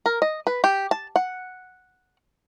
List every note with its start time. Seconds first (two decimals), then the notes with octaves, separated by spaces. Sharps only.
0.06 A#4
0.22 D#5
0.47 B4
0.64 G4
0.91 A5
1.16 F#5